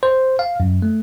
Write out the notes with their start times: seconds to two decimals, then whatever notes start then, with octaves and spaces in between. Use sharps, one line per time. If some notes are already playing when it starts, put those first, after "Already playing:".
0.03 C5
0.39 F5
0.60 F#2
0.82 A3